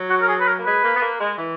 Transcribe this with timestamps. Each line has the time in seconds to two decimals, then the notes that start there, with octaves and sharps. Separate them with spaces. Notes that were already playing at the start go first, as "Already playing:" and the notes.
Already playing: F#3
0.10 F#4
0.21 A#4
0.28 G#4
0.40 B4
0.46 A#4
0.59 A#3
0.64 G#3 B4
0.83 A#3
0.96 B3
1.01 A#3
1.19 G#3
1.38 E3